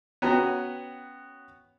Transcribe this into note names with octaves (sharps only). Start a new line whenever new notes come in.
B3 C#4 F#4 G5 A#5